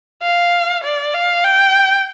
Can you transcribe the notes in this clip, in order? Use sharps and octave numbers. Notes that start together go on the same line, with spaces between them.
F5
D5
F5
G5